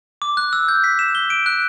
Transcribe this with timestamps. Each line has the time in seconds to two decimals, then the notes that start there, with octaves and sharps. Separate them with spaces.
0.22 D6
0.37 F#6
0.53 E6
0.68 G6
0.84 B6
0.99 E7
1.15 G7
1.30 D7
1.46 F#6